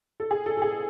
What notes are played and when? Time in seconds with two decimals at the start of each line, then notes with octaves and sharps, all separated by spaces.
0.20 A4
0.31 G#4
0.46 A4
0.57 A4
0.62 G#4